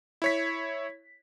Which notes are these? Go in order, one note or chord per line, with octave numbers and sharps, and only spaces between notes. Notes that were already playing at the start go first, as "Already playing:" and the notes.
E4 C#5 B6